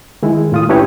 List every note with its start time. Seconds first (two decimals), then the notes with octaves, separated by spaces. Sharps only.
0.23 D#3 G#3 E4
0.52 A2 F4 D#6
0.69 C#4 D4 E4 G4 B4 C#5